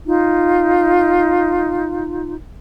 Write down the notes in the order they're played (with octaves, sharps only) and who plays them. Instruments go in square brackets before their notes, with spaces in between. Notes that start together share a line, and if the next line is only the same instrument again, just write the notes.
[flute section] D#4 F4